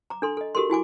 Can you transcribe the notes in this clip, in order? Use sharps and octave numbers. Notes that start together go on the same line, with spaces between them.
A#5 D6
D4 A4 C6
A4 D#5
F#4 G4 A4 A#4 C6
E4 F#4 G#5 D6